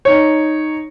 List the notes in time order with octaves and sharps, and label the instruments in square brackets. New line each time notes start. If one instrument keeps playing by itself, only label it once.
[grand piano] D#4 C#5